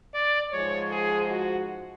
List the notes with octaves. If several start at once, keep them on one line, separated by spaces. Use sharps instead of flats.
D5
G#2 F3 G#3 C#5
G#4
F#4